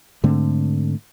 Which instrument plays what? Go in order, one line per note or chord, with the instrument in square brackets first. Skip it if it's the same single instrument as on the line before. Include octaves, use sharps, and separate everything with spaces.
[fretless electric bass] G#2 D3 A3 C4